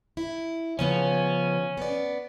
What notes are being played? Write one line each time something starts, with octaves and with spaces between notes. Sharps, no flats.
E4
C#3 F3 B3 C#4
B3 D5